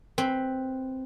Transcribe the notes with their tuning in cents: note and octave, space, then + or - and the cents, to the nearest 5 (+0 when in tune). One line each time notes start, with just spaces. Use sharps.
C4 +0 B4 +0